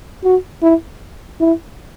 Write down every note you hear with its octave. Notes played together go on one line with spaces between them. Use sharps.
F#4
E4
E4